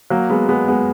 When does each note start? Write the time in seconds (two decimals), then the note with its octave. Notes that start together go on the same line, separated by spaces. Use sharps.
0.10 F#3 A#3
0.30 G#3 B3
0.49 G#3 B3
0.68 G#3 B3